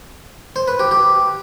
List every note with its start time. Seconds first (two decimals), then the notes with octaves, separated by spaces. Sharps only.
0.56 C5
0.68 B4
0.79 G4
0.91 G4